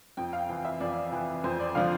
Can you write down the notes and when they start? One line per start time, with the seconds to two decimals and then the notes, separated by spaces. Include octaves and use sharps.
0.17 F2 G5
0.33 F5
0.49 E3
0.65 E5
0.80 F2 D5
1.12 E3
1.44 F2 C5
1.60 D5
1.75 D3 F3 F5